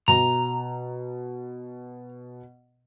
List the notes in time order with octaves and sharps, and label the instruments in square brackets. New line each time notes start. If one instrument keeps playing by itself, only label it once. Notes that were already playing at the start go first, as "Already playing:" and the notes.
[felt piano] B2 [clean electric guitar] A#5